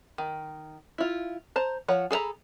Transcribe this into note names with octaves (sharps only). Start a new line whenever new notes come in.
D#3
E4 F4
C5 A5 A#5
F3 C#5 F#5
G#4 A4 C5 A#5 B5